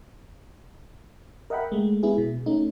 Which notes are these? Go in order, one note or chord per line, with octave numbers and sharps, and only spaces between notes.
A#4 D#5 E5 F#5 G5 B5
G#3 A3
G#3 B3 E4 G#4
B2
A3 C#4 D#4